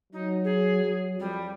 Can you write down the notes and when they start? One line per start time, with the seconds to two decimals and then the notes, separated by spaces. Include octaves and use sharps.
0.12 F#3 D#4
0.44 G#4
0.84 F#3
1.19 F2 G3